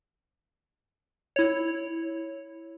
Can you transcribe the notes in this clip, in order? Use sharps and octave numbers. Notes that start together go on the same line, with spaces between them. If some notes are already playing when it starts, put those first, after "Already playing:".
E4 C#5